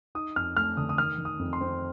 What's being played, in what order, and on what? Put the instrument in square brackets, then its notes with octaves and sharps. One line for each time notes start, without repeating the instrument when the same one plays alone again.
[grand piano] D#4 D#6
F2 F6
A3 F6
D3 D#6
D#6
D#3 F6
D#3
D#6
F2
C6
C4